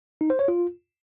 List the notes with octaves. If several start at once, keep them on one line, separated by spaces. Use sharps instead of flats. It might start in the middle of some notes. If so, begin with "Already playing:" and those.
D#4
C5
C#5
F4